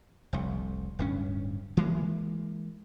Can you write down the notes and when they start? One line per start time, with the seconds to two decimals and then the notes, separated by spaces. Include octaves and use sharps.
0.33 F1 C2
0.99 D1 G2 C#4
1.77 E3 G#3 A#3